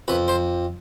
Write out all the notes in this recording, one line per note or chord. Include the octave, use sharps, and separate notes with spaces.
F2 B4
C5